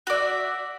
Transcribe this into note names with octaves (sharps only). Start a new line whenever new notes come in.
F#4 D5 E5